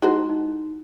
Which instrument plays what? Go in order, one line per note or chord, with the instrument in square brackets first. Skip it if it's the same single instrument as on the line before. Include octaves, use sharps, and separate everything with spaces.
[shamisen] G#3 F#4 C5 [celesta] D#4 E4
[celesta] D#4